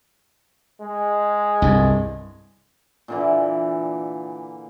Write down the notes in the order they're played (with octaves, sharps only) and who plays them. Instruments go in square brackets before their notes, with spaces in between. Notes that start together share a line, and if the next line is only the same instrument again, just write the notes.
[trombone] G#3
[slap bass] C2 G2
[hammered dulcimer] A#2 D3 E3